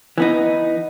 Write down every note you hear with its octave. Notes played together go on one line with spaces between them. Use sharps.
E3 B3 D#4